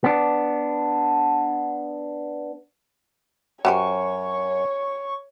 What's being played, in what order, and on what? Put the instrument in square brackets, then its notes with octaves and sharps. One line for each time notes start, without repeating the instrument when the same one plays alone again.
[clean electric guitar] B3 D4
[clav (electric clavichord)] F#2 [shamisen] F#4 G4 C5 [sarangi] C#5 [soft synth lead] C#6